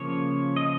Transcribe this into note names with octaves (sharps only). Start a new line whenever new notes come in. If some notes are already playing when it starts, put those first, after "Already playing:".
Already playing: C#3 F3 A#3 C#5
D#5